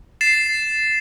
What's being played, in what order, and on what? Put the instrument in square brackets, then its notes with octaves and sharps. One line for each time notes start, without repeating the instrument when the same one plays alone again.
[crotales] A6 C7 E7